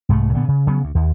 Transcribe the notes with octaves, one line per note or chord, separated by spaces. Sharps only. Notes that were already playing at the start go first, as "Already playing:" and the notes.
C2 G#2 F#3 A3
A#2 D3 B3
C#3
C#3 F#3 B3
D2
D#2